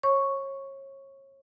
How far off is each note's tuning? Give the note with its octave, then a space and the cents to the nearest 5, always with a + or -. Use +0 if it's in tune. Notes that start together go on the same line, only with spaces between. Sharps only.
C#5 -30 C#6 +0